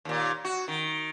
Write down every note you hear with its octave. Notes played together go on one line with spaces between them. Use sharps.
D#2 A#2
F#4
D#3